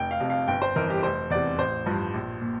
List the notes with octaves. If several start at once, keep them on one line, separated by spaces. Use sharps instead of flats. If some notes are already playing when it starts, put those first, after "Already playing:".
Already playing: F1 G5
F5
F2 C3
F5
G1 G5
C5
F2 E3 A#4
G4
F1 C5
E2 C3 D5
A1 C5
G2 F3
A#1
A#2